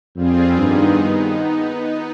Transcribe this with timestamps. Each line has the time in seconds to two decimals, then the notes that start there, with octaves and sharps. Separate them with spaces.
0.16 F2 G3 C4 F4 G#4
0.58 G2 D#3 B3 D#4 G#4
0.98 B3 D#4